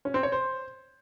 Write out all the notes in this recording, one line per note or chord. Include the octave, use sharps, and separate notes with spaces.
C#4
C4
C#5
C5